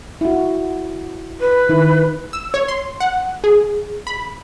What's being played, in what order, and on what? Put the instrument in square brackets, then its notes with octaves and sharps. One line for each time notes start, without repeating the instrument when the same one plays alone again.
[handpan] E4 F#4
[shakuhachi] B4
[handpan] D#3 E4
[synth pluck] E6
C#5
C6
F#5
G#4
B5